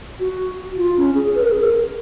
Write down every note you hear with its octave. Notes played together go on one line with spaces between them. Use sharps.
F#4
F4
C#4
G#4
B4
A#4
G#4
A#4